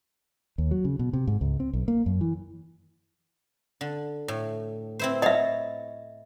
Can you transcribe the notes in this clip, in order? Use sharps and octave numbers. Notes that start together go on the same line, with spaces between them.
D#2
F#3
C#3
B2
C3
G#2
C#2
C4
B1
A#3
F#2
E3
D3
A2
C4 E4 C5
C#5 D#5 E5 C6